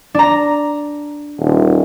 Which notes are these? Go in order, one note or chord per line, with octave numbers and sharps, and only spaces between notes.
D4 A#5
D#1